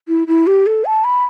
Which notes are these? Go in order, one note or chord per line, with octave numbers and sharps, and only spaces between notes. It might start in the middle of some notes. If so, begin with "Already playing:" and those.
E4
E4
G4
A4
A5
B5